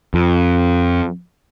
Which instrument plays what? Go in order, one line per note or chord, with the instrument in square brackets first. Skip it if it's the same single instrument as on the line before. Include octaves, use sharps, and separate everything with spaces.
[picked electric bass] F2